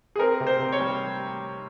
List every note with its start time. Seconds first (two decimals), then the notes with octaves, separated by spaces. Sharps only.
0.16 G#4
0.19 C4 A#4
0.40 C3
0.47 C5
0.59 C3
0.72 C#5
0.80 G3